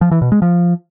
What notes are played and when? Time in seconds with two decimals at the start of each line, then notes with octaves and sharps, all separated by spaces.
0.01 F3
0.11 E3
0.22 B2
0.32 G#3
0.42 F3